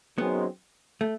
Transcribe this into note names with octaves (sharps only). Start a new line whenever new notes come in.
F#2 D#3 G#3 B3 C4
A3